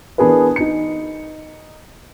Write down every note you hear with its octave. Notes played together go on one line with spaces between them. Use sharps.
E3 B3 D4 G#4 A#4 B4
D#4 C#7